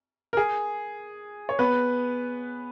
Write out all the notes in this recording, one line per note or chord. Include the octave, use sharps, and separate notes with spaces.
A#4
G#4
C#5
B3 B4